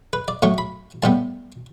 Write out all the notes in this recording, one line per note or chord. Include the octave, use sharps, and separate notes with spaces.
B4
D5
A2 F#3 A3 C#6
B5
A2 G3 B3 A5